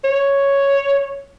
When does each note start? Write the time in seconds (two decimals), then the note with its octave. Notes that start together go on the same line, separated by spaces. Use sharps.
0.04 C#5